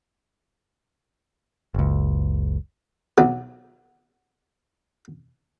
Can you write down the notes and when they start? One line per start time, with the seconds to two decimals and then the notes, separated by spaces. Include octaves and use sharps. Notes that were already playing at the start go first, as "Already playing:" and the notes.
1.74 F#1 C#2
3.18 B1 F#3